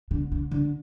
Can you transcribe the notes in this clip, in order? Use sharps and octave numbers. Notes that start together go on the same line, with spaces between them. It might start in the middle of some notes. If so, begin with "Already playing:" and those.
D3
D3
D3